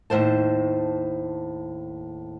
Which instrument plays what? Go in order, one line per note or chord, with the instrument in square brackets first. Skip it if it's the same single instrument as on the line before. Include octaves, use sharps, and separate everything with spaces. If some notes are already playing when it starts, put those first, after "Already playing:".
[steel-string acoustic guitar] D#2 A2 D#3 C5 A5